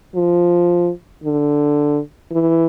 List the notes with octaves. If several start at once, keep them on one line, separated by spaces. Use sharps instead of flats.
F3
D3
E3